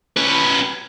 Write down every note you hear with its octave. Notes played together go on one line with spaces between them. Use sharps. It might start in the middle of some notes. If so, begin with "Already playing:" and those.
C#4 B4